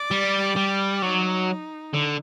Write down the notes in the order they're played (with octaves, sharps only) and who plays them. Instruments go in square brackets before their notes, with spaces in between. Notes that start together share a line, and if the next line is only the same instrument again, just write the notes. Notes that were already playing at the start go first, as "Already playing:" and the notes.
Already playing: [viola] D5
[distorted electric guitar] G3
G3
[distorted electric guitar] F#3 [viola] D#4
[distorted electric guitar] D3